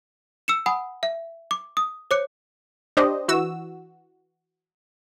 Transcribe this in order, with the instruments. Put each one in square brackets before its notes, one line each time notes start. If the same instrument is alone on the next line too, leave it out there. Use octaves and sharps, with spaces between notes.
[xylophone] E6 C#7 E7
F#5 G#5 B5 D#6
E5
D6
D#6
C5 C#5 D6 F#6 C#7
[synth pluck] D4 G4 C5 D#5
E3 F#4 E6